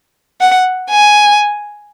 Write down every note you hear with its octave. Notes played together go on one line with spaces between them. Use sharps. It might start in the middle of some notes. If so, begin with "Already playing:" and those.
F#5
G#5